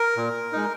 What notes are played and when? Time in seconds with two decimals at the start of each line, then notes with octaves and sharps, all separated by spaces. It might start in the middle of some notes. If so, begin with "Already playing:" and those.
Already playing: A#4
0.17 A#2
0.52 G#3 D#4